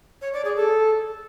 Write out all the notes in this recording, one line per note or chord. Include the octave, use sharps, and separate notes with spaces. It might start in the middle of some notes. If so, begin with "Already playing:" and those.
C#5
D5
G#4
A4